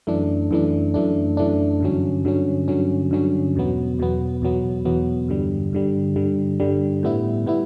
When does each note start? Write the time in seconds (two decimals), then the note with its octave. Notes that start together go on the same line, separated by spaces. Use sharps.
0.07 F#2 E3 A3 D4
0.51 F#2 E3 A3 D4
0.94 F#2 E3 A3 D4
1.37 F#2 E3 A3 D4
1.80 G2 D3 F#3 C#4
2.25 G2 D3 F#3 C#4
2.68 G2 D3 F#3 C#4
3.11 G2 D3 F#3 C#4
3.55 E2 B2 F#3 B3
3.99 E2 B2 F#3 B3
4.42 E2 B2 F#3 B3
4.85 E2 B2 F#3 B3
5.29 G2 D3 G3
5.73 G2 D3 G3
6.16 G2 D3 G3
6.60 G2 D3 G3
7.03 A2 G3 B3 E4
7.46 A2 G3 B3 E4